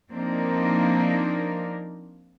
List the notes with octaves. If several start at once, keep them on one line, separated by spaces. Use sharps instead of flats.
F3 A#3 C4 D4 D#4 A#4